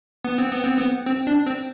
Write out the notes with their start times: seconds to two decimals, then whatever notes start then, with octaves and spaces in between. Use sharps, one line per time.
0.25 B3
0.38 C4
0.52 B3
0.65 C4
0.78 B3
1.06 C4
1.27 D4
1.46 C4